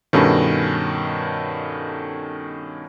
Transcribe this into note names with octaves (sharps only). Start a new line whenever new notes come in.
G2 B2 D#3 C#4 A4 B4